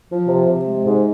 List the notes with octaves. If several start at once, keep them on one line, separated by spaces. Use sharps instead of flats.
F3
C3
C3
G#3
G#2